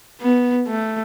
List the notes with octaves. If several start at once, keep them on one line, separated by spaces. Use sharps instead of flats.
B3
A3